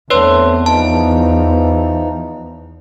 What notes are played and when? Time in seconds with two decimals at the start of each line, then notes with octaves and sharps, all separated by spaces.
0.10 E2 A3 C4 D4 B4 C#5 C6
0.66 E3 F3 D#4 A5